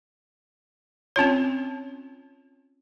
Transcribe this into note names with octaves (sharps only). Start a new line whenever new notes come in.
C4 C#4 F4 C#5